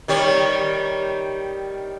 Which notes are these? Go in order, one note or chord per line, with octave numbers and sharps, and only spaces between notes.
D#3 G3 C#5